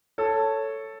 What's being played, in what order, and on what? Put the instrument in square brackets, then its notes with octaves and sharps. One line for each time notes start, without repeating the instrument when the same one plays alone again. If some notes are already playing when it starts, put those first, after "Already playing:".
[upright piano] A4 [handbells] C#5